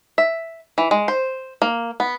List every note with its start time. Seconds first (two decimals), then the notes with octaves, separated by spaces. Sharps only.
0.18 E5
0.78 E3
0.91 G#3
1.08 C5
1.62 A#3
2.00 B3